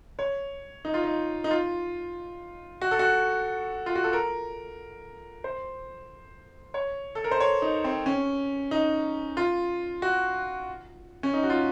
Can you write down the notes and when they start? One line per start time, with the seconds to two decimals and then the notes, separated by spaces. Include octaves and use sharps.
0.19 C#5
0.85 D#4
0.94 F4
1.04 D#4
1.44 D#4
1.51 F4
2.81 F#4
2.91 A4
2.99 F#4
3.86 F4
3.95 F#4
4.04 A4
4.13 A#4
5.44 C5
6.74 C#5
7.15 A4
7.24 A#4
7.31 C5
7.40 C#5
7.62 D#4
7.84 C4
8.06 C#4
8.71 D#4
9.37 F4
10.02 F#4
11.23 C#4
11.34 D#4
11.43 F#4
11.50 F4